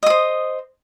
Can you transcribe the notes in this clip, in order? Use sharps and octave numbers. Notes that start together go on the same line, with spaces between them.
C5 D#5 D#6